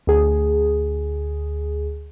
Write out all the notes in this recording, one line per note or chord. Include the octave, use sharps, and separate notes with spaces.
D2 G#4